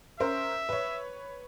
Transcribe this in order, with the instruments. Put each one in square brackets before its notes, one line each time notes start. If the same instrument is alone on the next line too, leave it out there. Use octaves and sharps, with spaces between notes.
[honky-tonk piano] C#4 A#4 C5 [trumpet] E5
[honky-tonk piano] B4 C#5